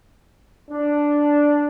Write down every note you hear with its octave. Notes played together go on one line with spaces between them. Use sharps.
D4